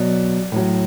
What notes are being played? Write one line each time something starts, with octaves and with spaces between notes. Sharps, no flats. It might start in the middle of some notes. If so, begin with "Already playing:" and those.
Already playing: B2 F#3 D5
A2 F#3